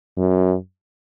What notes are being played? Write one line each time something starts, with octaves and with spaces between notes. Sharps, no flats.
F#2